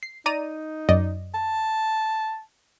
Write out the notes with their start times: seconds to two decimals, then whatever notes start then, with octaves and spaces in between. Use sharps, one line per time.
0.03 C7
0.26 D#4 D5 A#5 D#7
0.89 F#2 D5 D#5
1.34 A5